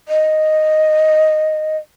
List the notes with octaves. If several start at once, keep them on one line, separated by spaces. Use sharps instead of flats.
D#5